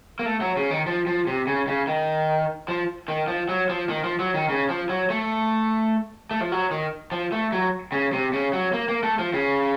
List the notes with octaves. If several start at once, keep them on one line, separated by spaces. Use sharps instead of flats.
A#3
A3
F#3
C#3
D#3
F3
F3
C3
C#3
C#3
D#3
F3
D#3
F3
F#3
F3
D#3
F3
F#3
D#3
C#3
F3
F#3
A3
A3
F3
F#3
D#3
F3
A3
F#3
C#3
C3
C#3
F#3
A#3
A#3
A3
F3
C#3